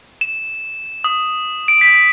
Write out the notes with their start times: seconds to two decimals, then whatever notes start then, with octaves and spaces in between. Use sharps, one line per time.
0.21 E7
1.04 D#6
1.68 D7
1.81 B6